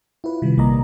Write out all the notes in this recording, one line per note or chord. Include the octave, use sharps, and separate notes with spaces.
E4 F4 B4
C3 D#3 G3
A#1 A#3 D5 D#5 A#5